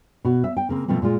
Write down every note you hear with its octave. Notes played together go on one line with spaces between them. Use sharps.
B2 F#4
E5
G5
C#3 A#3 C4
B2 F3 A3 C4
A#2 G#3 F4